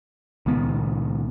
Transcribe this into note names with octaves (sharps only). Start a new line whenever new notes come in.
C#2 A#2 D#3 B3